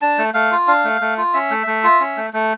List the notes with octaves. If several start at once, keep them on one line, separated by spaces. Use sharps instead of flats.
D4 A5
A3
A3 F5
F4
D4 F5
A3
A3
F4
C#4 E5
A3
A3
F4
C#4
A3
A3